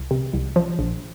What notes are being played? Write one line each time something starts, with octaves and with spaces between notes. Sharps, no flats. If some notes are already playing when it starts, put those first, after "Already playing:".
Already playing: C2
C3
C2
F3
A#1